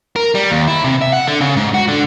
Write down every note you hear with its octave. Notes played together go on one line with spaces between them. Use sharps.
A#4
G3
D#2
E4
C3
E5
F#5
D3
C#3
G#2
F#4
D3